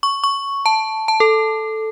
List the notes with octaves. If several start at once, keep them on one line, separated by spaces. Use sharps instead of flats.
C#6
C#6
A5
A5
A4